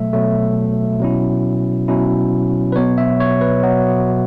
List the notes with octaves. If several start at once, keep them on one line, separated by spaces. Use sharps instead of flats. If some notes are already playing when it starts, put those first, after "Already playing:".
Already playing: B2 F#3 A3 E5
B2 F#3 A3
B2 F#3 C#4 E4
B2 F#3 C#4 E4
B4
B2 F#3 B3 C#5
E5
C#5
B4
B2 F#3 B3